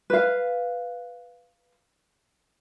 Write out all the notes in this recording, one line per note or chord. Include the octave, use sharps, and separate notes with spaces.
B4 F5